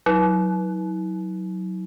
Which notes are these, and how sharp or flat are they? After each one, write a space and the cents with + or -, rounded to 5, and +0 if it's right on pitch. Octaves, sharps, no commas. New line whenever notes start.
F#3 +0 E4 -45